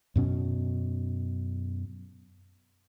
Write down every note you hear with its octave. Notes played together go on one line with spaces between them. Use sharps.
F#2 B2 C#4